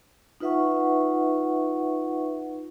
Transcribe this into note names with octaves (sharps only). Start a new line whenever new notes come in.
D#4 F4 B4 E5 F#5 C#6